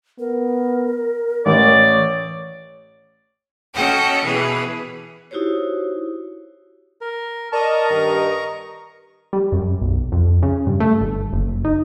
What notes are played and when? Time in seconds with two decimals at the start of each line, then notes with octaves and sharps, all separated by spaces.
0.19 B3 A#4
1.46 A1 C#5 D5
3.73 C#4 F#4 A4 D#5 F#5 G5
4.24 B2 E3 G#4 B4
5.31 D#4 E4 F#4 G4 C5 C#5
7.01 A#4
7.52 A#4 D5 D#5 A5 A#5 C#6
7.90 G2 D#3
9.33 G3
9.52 F#2
9.81 B1
10.12 F2
10.43 C#3
10.67 G2
10.80 A3
11.01 G1
11.32 F#1
11.65 D#4